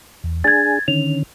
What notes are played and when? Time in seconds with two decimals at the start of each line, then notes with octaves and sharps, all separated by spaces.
0.24 E2
0.44 D4 G#4 G#5 G#6 A6
0.88 D3 D#3 C#4 F7